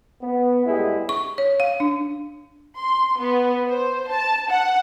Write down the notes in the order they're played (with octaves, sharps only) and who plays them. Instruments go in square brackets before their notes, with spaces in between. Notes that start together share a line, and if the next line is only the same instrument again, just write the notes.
[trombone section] B3
A2 G3 G#3 B3 E4 G#4
[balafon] C#6
C#5
F5
D4
[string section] C6
B3
C5
A5
F#5